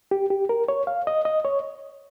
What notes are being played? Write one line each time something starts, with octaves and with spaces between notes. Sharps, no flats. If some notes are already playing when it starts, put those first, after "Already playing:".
G4
G4
A#4
C#5
F5
D#5
D#5
C#5